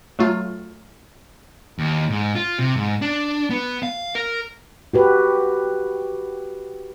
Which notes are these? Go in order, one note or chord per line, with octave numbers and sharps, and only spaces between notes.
F#3 A3 F4
D#2
G#2
F4
C3
G#2
D4
B3
F5
A#4
F#4 G4 B4